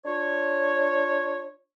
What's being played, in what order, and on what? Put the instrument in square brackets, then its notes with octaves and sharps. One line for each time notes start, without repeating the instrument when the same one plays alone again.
[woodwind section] D4 F4 C#5